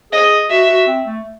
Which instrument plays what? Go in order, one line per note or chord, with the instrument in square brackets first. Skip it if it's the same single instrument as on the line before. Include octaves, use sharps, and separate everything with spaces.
[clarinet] G#4 [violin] D#5
[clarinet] F#4 [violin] E5
[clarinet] F#4
C4
A3